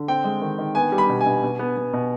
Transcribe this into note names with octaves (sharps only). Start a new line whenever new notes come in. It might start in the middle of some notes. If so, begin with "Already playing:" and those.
Already playing: D3
C4 G5
G#3
D#3
D#3
B3 G#5
G3
B5
B2
G#5
B2
B2
B3
B3
B2